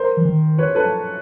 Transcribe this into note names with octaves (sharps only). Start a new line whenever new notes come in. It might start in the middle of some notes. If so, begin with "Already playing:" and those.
Already playing: A#4 C5
E3
D#3
B4 C#5
A4 B4